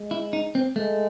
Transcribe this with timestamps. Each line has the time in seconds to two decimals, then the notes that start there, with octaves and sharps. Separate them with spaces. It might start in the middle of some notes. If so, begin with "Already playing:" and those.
Already playing: G#3
0.11 E4
0.33 D#4
0.55 C4
0.76 G#3 A3